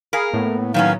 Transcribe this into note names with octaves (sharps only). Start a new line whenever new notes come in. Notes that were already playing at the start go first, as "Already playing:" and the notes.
G#4 A#4 F5 B5
A2 A#3 B3
D#3 F#3 B3 C#4 F5